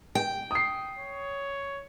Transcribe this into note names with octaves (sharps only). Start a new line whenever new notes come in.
G5
D#6 C7
C#5